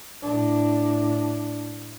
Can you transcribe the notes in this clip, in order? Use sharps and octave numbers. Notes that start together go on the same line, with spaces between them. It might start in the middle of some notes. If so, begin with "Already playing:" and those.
A2 D4